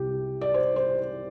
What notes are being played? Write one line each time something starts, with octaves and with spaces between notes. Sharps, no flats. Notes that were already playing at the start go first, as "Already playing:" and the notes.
Already playing: C2 C3 G4
D5
C5
C5